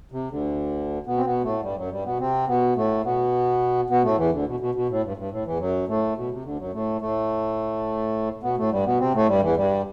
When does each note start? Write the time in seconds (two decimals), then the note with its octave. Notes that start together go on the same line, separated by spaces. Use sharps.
0.12 C3
0.31 D2 D3
1.06 B2 B3
1.17 C4
1.25 B2 B3
1.44 A2 A3
1.63 G2 G3
1.77 F#2 F#3
1.91 G2 G3
2.05 B2 B3
2.20 C3 C4
2.48 B2 B3
2.76 A2 A3
3.04 B2 B3
3.90 B2 B3
4.04 A2 A3
4.18 E2 E3
4.32 D2 D3
4.47 B2
4.60 B2
4.75 B2
4.89 A2
5.03 G2
5.17 G2
5.31 A2
5.45 E2 E3
5.59 F#2 F#3
5.88 A2 A3
6.17 B2
6.31 C3
6.44 D2 D3
6.59 F#2 F#3
6.73 A2 A3
7.01 A2 A3
8.43 B2 B3
8.57 A2 A3
8.72 G2 G3
8.86 B2 B3
9.00 C3 C4
9.14 A2 A3
9.28 G2 G3
9.42 E2 E3
9.56 G2 G3